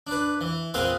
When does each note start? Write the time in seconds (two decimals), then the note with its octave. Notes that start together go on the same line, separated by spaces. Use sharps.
0.07 D4 B4
0.41 E3
0.74 A#2 C4 G#4 B4 F5 C6